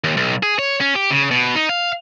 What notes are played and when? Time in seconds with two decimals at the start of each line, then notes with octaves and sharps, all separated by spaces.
0.04 D#2
0.17 B1
0.43 G#4
0.59 C#5
0.81 C#4
0.95 G4
1.11 C#3
1.31 B2
1.55 D#4
1.69 F5